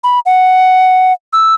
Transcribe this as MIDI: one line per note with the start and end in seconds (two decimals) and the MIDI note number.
0.04 0.20 83
0.26 1.13 78
1.33 1.55 88